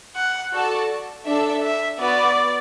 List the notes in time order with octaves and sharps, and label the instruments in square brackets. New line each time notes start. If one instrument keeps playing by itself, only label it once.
[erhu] F#5
[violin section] F#4 A4 D5 A5
D4 A4 E5
[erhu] E5
[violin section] B3 F#4 B4 [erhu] D5